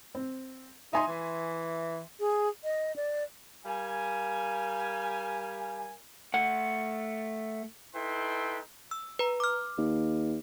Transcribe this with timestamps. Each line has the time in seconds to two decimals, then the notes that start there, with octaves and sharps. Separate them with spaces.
0.15 C4
0.93 D#4 E5 G#5 C6
1.08 E3
2.20 G#4
2.64 D#5
2.96 D5
3.66 G3 A#4 F5 G#5
6.34 A3 F#5
7.96 D#4 E4 A4 B4 G5 C6
8.91 E6
9.19 B4 A#5
9.40 D6 F6
9.78 D#2